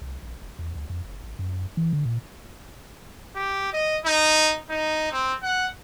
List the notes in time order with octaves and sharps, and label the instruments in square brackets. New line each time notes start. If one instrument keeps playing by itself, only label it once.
[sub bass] C2
A#1
F1
E2
D2
F2
F#1
A1
F#2
E3
D3
A#2
[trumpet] G4
D#5
D#4
D#4
C4
F#5